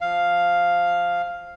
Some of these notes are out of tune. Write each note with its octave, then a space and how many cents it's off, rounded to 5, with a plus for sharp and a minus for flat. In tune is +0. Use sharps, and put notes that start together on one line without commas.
F3 +0 F5 +0